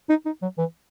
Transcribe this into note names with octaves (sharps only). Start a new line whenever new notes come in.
D#4
D#4
F#3
E3